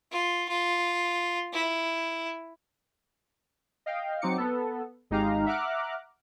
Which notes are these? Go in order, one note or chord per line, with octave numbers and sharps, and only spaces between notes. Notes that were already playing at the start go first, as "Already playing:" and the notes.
F4
F4
E4
D#5 F5 G5
F#3 C4 D#4 D6 C#7
B3 A4
G#1 G#3 D#4 G4 F5 A#5
E5 F#5 A#5 D6 F6 F#6